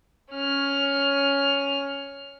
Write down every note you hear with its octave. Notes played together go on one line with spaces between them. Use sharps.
C#4 F6